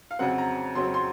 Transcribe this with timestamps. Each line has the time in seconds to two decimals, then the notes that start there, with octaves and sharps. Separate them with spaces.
0.11 F5
0.19 F2 C#3 F#3 C4 F#5
0.38 A#5
0.75 F2 C#3 F#3 C4 C6
0.94 C6